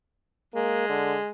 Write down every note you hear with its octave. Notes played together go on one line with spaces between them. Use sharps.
G#3 A#3
D3